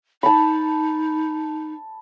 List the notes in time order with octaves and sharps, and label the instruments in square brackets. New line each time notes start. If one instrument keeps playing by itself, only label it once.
[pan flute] D#4 [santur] A5 B5